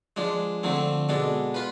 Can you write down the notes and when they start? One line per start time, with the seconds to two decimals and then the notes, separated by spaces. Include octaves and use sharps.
0.16 F3 G#3 D4
0.63 D3 F3 A3 C4
1.09 B2 G#3 D4 A4
1.54 F4 B4